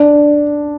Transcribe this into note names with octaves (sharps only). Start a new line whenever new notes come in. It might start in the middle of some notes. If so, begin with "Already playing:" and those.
Already playing: D4